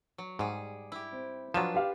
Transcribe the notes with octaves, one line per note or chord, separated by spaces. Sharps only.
F#3
G#2 G3 G#4
E4 G4
C4
F3 F#3 D4 F4 B4 E7
G4 F5